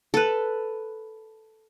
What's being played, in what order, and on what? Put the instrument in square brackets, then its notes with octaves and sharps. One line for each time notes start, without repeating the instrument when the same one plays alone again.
[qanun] A4 B4